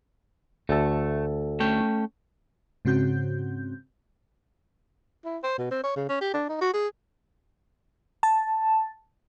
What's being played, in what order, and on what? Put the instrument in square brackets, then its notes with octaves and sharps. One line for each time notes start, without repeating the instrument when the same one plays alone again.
[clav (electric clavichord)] D2 A4 [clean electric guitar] A3
[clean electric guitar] A3 C#4 G5
[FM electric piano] G#2 C#3 C4 F#4 G6
[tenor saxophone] E4
C5
B2
C4
C#5
C#3
C#4
G4
D4
D#4
F#4
G#4
[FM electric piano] A5